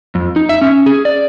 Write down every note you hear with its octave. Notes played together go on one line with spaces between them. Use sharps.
F2
D#4
E5
C#4
G#4
D5